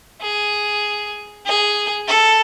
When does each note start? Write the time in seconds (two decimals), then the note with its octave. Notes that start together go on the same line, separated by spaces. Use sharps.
0.22 G#4
1.46 G#4
2.08 A4